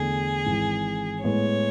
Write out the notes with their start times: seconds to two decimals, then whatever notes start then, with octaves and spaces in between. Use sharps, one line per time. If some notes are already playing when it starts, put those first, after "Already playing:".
Already playing: E2 D3 A3 G#4
0.46 G#1 G#2 E3
1.24 A2 G#3 B3 C#5